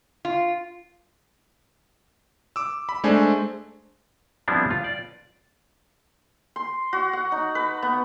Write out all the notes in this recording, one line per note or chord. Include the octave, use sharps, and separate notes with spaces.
F4
D6 E6
B5
G#3 A3 D4 C5 G#5
F3 G3 B3 C4 D4 E4
F4
D5
C6
F#4
F#5
D#4
B4
B3